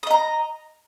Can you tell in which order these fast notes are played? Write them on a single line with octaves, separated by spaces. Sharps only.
D#6 D#5 A#5